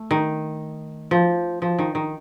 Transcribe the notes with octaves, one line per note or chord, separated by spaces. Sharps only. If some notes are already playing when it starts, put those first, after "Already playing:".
Already playing: A3
D#3
F3
F3
D#3
D#3